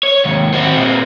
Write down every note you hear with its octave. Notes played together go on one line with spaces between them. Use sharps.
C#5
D#2 G#2
C4 F#4
A#2 C4